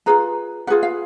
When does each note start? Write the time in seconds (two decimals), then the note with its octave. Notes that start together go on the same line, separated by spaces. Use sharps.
0.06 F4 G#4 B4 A#5
0.67 F4 G#4 B4 F#5
0.83 F5